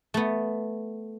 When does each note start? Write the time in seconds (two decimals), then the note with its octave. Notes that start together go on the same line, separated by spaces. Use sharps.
0.14 A3 B3